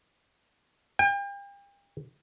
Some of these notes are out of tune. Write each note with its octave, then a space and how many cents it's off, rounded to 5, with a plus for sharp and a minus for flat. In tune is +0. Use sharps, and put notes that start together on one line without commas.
G5 +40